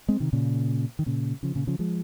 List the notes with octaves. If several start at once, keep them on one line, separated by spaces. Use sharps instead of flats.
G#3 C4
C3 D#3
A#2 C#3
D#3
A#2 C#3
C#3 F3
A#2 C#3
C#3 F3
F3 G#3